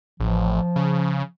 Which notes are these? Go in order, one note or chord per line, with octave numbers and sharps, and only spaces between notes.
A1 F3
C#3